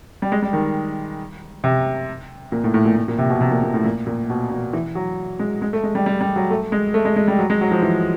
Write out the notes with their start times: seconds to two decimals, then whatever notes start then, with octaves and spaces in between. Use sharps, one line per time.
0.22 G3
0.32 G#3
0.42 G3
0.53 D#3
1.64 C3
2.52 A#2
2.64 A2
2.74 A2
2.85 A#2
2.96 A2
3.08 A#2
3.18 C3
3.30 B2
3.41 C3
3.51 A#2
3.64 A#2
3.74 A2
3.84 A#2
4.07 A#2
4.30 B2
4.51 B2
4.73 E3
4.95 F#3
5.39 G#3
5.62 G#3
5.73 A3
5.83 G#3
5.95 G3
6.06 G3
6.21 G3
6.36 F#3
6.50 A3
6.72 G#3
6.94 A3
7.05 G#3
7.16 G#3
7.28 G3
7.39 F#3
7.50 G#3
7.61 F#3
7.71 F3
7.82 E3